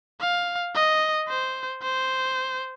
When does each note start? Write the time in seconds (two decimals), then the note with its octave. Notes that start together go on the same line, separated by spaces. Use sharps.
0.20 F5
0.75 D#5
1.29 C5
1.82 C5